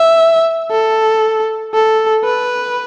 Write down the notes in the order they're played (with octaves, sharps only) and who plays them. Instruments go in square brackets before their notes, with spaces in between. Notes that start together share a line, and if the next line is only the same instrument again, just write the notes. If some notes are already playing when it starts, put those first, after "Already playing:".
Already playing: [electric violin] E5
A4
A4
B4